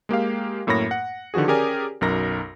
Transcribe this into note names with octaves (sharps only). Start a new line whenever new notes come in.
G#3 A#3 G4 F5
F#2 A2 A#3 C#5 B5 A#6
F#5
D3 D#3 F3 F#4 G#4
C#4 G4 G#4 A#4 D5 G#5
B1 F#2 D#4 A#4 A#6